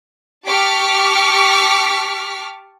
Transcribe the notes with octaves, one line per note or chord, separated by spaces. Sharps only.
G4 A5 C#6 D6 F6 B6